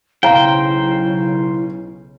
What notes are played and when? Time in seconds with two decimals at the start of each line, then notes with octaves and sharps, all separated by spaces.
0.23 B1 C#3 E4 C5 F5 G5 A#5